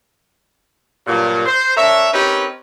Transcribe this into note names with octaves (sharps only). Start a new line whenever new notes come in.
G2 A#2 F#3
C5
D4 A#4 C#5 E5
C4 C#4 D#4 G4 A#4 B4